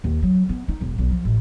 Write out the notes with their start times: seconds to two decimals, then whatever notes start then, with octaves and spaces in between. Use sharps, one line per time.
0.04 D#2
0.22 F#3
0.49 B3
0.68 D#4
0.81 E1
0.98 B1
1.10 F3
1.25 A1